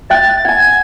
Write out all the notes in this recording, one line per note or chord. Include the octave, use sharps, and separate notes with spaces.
E5 G5 F#6 A6
F#5 G#5 G#6